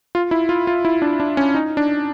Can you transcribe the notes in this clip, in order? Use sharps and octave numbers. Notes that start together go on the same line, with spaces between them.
F4
E4
F4
F4
E4
D4
D4
C#4
D#4
D4